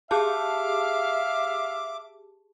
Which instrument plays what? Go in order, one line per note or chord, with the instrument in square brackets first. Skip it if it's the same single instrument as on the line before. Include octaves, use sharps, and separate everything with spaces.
[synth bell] G4 G#4 A5 [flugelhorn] E5 [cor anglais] F5 [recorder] D6